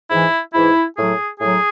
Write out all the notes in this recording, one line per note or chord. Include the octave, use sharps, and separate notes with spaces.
G#2 E3 E4
G#2 E3 E4
A2 F#3 G#4
A2 F#3 G#4